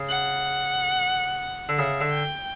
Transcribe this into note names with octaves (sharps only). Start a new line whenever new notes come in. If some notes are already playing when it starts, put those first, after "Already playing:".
Already playing: C#3
F#5
D3
C#3 E5
D3
G5